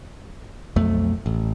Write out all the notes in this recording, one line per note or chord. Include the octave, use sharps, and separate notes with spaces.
B1 F2 A3
A1